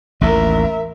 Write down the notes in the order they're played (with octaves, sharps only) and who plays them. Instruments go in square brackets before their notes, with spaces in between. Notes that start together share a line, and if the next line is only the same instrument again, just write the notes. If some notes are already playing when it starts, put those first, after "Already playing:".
[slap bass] A1 D#2 A2 [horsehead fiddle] A#4 E5